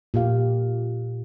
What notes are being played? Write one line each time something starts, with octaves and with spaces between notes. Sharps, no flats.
A#2 G4 F5